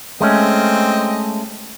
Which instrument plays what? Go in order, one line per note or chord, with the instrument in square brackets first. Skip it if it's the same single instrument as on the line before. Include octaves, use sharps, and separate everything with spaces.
[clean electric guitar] G#3 A3 C#4 [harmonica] C4 D#5